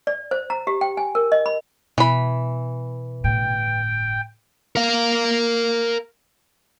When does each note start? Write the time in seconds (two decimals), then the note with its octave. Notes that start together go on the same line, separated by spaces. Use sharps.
0.07 D5
0.31 C5
0.50 A#5
0.67 G4
0.81 G5
0.97 G#5
1.15 A#4
1.32 D#5
1.46 B5
1.98 B2 E3 B5
3.24 G1 A2 G5
4.76 A#4 F5